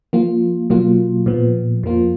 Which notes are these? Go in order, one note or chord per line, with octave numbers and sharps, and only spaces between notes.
F3 A#3 F4
B2 F#3 A#3 F4
A#2 F3 B3
F2 F3 A#3 F4